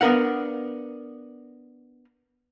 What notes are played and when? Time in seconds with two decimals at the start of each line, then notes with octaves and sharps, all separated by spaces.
0.01 B3 D4 A#4 F5 F#5